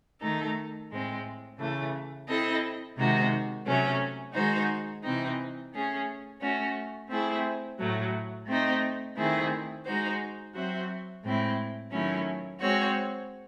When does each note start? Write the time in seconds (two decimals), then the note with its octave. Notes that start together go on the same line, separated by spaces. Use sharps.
0.21 D#3 A3 D#4 A4
0.90 A2 G#3 C4
1.59 C#3 E3 A3
2.28 C4 E4 A4 D#5
2.97 C3 D#3 G#3 D#4 F#4
3.66 C3 F#3 A3 C#4
4.34 D#3 G#3 D#4 F#4 C5
5.03 C3 E3 C4 D#4
5.73 A3 C#4 G#4
6.41 A3 C#4 F#4
7.10 A3 C4 E4 G#4
7.79 A2 F#3 A3
8.48 A3 C4 D#4
9.17 D#3 A3 C4 E4 G#4
9.86 G#3 D#4 F#4 C5
10.54 F#3 C4 F#4 C5 E5
11.24 A2 G#3 C4 E4
11.92 D#3 F#3 A3 C#4 E4
12.61 G#3 C4 F#4 C#5